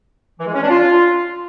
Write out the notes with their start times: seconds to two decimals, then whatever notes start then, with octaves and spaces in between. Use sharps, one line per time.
0.39 E3
0.46 G#3
0.54 C#4
0.62 D4
0.70 F4